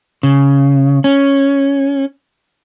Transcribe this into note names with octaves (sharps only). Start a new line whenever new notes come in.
C#3
C#4